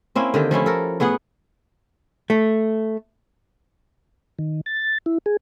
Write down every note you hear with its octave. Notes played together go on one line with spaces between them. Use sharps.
A#3 C4 C#4 E4
D3 D#3 G4
F3 A3 C#4 E4
A4 A#4
A2 B3 G#4 F#5
A3
D#3
A6
E4
G#4